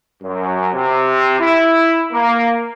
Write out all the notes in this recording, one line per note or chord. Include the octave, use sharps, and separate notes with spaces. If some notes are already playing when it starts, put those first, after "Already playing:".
F#2
C3
E4
A#3